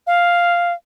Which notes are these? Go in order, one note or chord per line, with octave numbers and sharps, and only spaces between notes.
F5